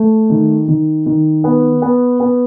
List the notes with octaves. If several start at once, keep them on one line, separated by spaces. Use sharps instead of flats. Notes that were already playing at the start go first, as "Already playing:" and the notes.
Already playing: A3
D#3
D#3
D#3
B3
B3
B3